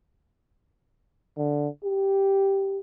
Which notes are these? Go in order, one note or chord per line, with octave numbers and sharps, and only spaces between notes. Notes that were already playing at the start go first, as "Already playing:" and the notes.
D3
G4